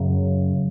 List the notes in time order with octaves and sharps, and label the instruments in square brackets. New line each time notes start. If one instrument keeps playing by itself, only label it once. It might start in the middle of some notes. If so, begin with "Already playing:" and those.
Already playing: [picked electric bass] F#2 C#3 F#3